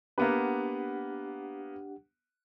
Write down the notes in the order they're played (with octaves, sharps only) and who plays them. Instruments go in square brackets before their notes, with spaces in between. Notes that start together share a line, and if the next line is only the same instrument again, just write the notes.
[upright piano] A#3 B3 B4 [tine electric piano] D4 G4 F#5